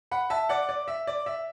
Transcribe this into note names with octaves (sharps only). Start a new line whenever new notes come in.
F#5 B5
E5 A5
D5 F#5
D5
E5
D5
E5